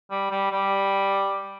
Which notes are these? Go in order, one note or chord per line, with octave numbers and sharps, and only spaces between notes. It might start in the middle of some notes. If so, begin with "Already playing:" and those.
G3
G3
G3